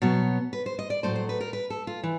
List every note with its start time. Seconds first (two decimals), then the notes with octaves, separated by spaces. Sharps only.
0.02 B2 F#3 B3 C#5
0.53 B4
0.66 C5
0.79 D#5
0.90 D5
1.03 A2 F#3 A3 C5
1.15 C5
1.29 B4
1.41 A#4
1.53 B4
1.70 A4
1.87 F4
2.03 E3